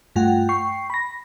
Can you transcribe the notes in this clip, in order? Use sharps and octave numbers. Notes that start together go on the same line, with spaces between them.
G2 A3 F4 F#5 G5
G5 C#6 C7
B5 A#6